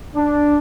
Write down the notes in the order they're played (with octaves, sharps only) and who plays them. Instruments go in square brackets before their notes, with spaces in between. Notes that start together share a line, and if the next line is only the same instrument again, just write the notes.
[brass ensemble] D4